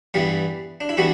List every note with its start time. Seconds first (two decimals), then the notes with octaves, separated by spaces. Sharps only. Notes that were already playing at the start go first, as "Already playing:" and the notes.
0.14 G2 E3 G3 B3
0.81 D4
0.89 E4
0.97 E3 G3 B3 D4 F#4